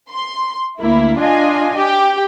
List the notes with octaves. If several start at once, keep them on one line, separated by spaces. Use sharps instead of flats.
C6
D2 A#3 E4
D4 F4 D#5 G#5
G4